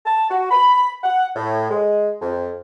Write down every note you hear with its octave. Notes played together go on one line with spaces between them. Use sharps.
A5
F#4
B5
F#5
A2
G#3
F2